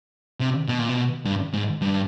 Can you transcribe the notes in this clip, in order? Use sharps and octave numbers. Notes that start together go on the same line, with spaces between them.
C3
B2
A#2
B2
G2
G#2
G2